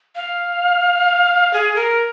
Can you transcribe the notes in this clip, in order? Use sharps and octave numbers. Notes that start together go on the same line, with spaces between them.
F5
G#4
A#4